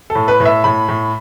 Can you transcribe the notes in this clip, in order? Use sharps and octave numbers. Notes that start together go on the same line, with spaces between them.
A4
A2
B4
A2
E5
A2 B5
A2